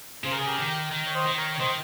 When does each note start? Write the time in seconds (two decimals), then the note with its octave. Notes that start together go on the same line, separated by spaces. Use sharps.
0.24 C#3 C5
0.31 A#4
0.38 G#4
0.46 G4 A#4
0.57 D#3
0.91 D#3
1.06 C#5
1.14 C5 D#5
1.26 D#3
1.37 A#4 C#5
1.55 C#5
1.59 D#3 C5 D#5